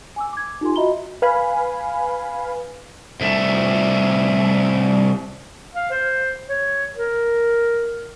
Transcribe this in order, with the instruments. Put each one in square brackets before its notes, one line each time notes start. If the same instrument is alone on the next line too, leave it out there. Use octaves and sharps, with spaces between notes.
[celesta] G#5 D6 E6
D6 G#6
D#4 F4 G4 A4 G#5 C6
F#4 D#5 E5 A#5 B5 G7
[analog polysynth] B4 F5 G#5 B5
[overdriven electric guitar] C2 A3
[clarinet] F5
C5
C#5
A#4